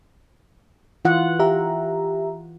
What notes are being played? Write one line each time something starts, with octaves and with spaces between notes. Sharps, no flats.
E3 F4 F#5
G4 E5 A#5